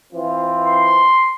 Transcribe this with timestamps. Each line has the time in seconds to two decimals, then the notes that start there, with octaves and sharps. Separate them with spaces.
0.12 E3 C4 F4
0.67 C6